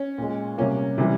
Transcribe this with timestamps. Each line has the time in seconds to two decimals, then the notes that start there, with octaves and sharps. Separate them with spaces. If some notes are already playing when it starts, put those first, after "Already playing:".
Already playing: C#4
0.18 A#2 G#3
0.58 C3 G3 A#3 C#4
0.98 C3 E3 G3